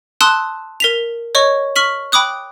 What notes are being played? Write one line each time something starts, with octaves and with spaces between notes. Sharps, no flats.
A5 C6 D#6 E6 F#6
A#4 B6 F7
C#5 D#5 C#6
C#6 F6 B6 F#7
G5 B5 D6 D#6 F#6